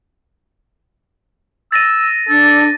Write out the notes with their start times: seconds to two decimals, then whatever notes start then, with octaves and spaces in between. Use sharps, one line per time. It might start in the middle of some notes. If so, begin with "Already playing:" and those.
1.72 E6 A6 A#6 D#7
2.29 D4 A4